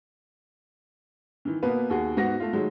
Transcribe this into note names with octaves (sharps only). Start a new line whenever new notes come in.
D#3 E3
B2 A#3 B3 B4
D#2 F#4 G#4
G#2 B3 F#4 A#6
A3 F4
D#3 F#3 G#3 A3